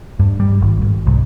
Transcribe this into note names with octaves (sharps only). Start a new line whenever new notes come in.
G2
G3
G#1
G#1
C2